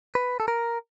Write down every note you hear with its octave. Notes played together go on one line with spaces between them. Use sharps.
B4
A4
A#4